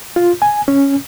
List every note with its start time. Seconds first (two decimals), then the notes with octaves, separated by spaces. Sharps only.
0.16 F4
0.42 G#5
0.68 C#4